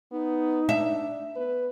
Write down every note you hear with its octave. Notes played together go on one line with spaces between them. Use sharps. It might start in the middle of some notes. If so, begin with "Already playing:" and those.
B3 D#4
D4 E5
B3 B4